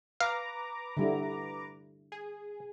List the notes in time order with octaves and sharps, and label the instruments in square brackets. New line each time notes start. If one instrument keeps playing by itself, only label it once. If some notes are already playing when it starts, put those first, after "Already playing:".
[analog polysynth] B4 A#5 D6 [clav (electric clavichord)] F5
[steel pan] D3 G3 E4
[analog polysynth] G#4